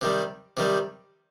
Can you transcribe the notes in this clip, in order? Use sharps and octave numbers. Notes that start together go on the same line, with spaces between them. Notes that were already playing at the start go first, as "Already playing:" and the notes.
C3 D#3 G3
C3 D#3 G3